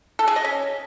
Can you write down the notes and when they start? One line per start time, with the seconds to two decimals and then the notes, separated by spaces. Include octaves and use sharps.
0.19 A4
0.28 G#4
0.36 D#5
0.45 C#4